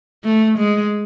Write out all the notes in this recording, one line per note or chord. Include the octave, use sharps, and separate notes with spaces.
A3
G#3